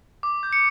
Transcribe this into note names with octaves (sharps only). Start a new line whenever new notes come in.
D6
G6
C#7